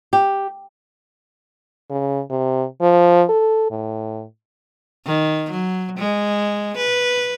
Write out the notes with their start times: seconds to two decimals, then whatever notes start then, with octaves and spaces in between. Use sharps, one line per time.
0.13 G4
1.90 C#3
2.30 C3
2.81 F3
3.29 A4
3.71 A2
5.06 D#3
5.51 F#3
5.98 G#3
6.77 B4